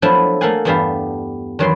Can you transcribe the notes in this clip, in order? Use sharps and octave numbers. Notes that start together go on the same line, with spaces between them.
F3 F#3 A3 B3 D4 E4
A3 A#3 A4 F5 F#5 G#5
E2 G2 B3 G4 F5 A5
E2 D#3 F#3 B4 D5 C6